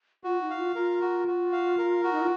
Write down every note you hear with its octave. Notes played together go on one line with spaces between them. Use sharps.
F4 F#4
D#4
F5
F4
F4 A#4
F#4
F#4
F5
A#4
F#4
D#4
F4